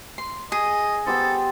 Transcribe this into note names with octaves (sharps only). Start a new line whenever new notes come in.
C6
G#4 D#5
B3 G4 A4 C5